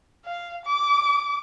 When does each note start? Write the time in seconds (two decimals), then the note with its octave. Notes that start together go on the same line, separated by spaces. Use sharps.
0.25 F5
0.65 D6